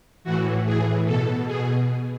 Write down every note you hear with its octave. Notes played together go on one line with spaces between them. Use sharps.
A2 E3 F#4
A2 E3 G#4
B2 A4
B2 G#4